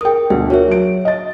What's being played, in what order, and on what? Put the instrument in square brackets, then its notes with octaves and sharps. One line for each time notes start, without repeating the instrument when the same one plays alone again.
[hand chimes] G#4 D#6 [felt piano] A#4 G5
[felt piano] D2 B2 [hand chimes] G#4
[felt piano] F#4 A#4 [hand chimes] C#5 E5
[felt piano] F#3 D7
D#5 A6